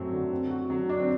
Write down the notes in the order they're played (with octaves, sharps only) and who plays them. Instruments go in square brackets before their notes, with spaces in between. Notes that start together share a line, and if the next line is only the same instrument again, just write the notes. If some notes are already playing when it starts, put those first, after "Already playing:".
Already playing: [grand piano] F#2 A3 C4 [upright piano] F#3
[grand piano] D3
C4
F#4
[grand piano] D3 [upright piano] F#3
[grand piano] F#3 [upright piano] D4
[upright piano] C4